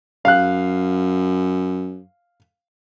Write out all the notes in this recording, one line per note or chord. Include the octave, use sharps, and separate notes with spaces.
F#2 F5 F#6